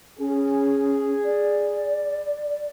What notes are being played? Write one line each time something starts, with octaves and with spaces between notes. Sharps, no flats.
C#4 G#4
D5